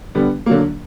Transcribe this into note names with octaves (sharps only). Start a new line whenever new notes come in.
D3 G3 B3
D3 F#3 A#3